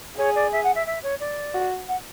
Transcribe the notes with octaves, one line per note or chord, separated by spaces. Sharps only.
G#4 C#5
D5
E5
F#5
E5
E5
C#5
D5
F#4
F#5